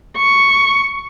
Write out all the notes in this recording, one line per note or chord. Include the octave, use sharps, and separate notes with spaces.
C#6